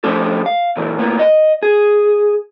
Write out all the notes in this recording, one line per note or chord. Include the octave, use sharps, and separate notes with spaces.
D3 F3 A3 C#4 G4 A4
F5
A#2 E3
A2 A#3 B3
D#5
G#4